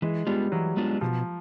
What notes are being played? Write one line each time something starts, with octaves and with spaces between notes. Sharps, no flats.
E3 G#3
G3 G#3 B3 D4 F4
E3 F#3
G#3 B3 D4 F4
B2 F3